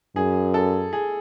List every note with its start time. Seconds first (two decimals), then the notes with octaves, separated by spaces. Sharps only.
0.16 F#2 G#4
0.54 A4
0.93 G#4